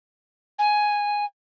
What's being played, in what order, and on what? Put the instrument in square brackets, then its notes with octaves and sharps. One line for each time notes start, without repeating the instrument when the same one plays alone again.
[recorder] G#5